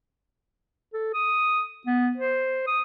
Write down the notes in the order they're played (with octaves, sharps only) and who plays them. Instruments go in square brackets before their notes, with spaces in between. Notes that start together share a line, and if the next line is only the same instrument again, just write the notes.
[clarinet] A4
D#6
B3
C5
D#6